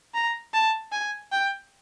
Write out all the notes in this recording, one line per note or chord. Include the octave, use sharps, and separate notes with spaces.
A#5
A5
G#5
G5